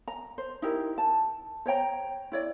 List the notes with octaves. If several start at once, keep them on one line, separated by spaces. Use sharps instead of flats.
A#5
C5
D#4 E4 G4 A#4
A5
C5 C#5 G5 A#5
E4 C#5 D5